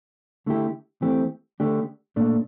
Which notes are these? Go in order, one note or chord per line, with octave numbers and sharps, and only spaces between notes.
D3 A3 E4 G4
E3 A3 C4 G4
D3 A3 D4 G4
A#2 A3 D4